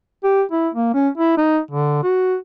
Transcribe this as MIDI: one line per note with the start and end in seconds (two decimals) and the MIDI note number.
0.24 0.42 67
0.51 0.69 64
0.74 0.91 58
0.94 1.08 61
1.18 1.34 64
1.37 1.59 63
1.71 2.00 50
2.03 2.36 66